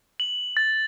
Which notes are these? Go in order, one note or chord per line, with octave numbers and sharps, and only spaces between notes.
F#7
A6